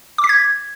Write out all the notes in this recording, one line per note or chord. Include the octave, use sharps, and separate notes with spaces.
D6
B6
G#6